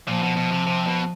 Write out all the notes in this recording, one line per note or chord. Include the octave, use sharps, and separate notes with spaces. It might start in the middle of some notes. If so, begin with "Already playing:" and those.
A#2 F3
B2
B2
C3
C3
B2